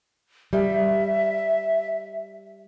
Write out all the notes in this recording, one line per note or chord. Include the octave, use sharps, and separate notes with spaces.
G3 E5